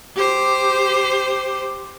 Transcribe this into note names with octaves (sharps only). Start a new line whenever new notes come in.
G4 C5